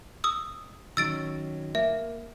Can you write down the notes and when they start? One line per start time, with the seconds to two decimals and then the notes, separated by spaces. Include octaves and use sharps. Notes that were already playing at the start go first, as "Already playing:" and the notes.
0.24 D#6 E6
0.97 D#3 F#3 C#4 E6 A6 D7
1.75 A#3 E5